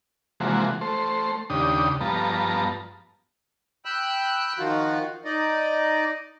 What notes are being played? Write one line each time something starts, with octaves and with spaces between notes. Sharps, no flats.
C3 E3 F3 G#3 A#3 F#4
A3 C5
D#2 C#3 D4 G4 D#6
G2 F3 B3 A5 A#5
G5 B5 E6 F#6
D#3 F3 F4 F#4
D#4 D5 D#5